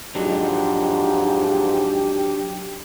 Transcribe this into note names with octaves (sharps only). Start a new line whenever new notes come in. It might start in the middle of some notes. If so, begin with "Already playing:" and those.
F2 G#2 F#3 D4 D#4 G4